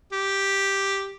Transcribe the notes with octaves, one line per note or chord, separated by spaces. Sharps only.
G4